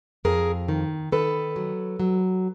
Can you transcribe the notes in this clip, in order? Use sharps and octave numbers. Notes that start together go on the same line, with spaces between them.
F2 G#4 A#4
D#3
D#3 A4 B4
F#3
F#3